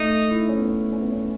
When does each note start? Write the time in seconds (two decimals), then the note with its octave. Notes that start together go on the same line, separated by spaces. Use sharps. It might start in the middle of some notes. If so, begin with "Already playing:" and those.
Already playing: A3 D#4
0.31 E4
0.41 D#4
0.49 C#4
0.57 B3
0.92 C#4
1.02 B3
1.12 C#4